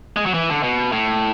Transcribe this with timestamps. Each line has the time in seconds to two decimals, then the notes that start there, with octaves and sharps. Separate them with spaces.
0.16 G#3
0.26 F#3
0.34 E3
0.50 D3
0.63 B2
0.92 A2